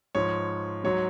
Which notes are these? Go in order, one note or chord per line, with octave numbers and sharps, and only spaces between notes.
G#2 F3 C#5
G#2 F#3 C#5